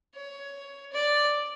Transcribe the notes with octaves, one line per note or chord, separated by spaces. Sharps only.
C#5
D5